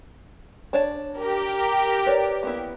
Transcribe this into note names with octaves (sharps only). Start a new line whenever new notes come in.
D4 C#5 A5
G4 A#4
B4 C#5 D5
A#3 B3 E4